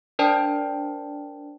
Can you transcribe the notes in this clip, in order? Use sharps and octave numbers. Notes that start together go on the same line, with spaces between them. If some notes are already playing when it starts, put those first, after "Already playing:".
D4 A#4 C5 D5 G5 A5